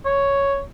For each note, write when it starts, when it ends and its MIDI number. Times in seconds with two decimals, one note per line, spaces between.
0.05 0.59 73